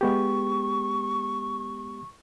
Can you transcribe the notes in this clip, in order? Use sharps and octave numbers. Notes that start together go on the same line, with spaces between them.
G#3 B3 G4 C#6